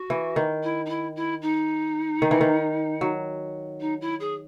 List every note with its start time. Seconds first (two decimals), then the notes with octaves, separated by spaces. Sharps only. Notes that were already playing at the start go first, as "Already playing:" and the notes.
Already playing: F#4
0.10 E3
0.36 D#3
0.63 E4
0.86 D#4
0.89 E4
1.16 E4
1.42 D#4
2.22 D#3
2.31 E3
2.41 D#3
3.01 F#3
3.80 D#4
4.01 E4
4.20 G#4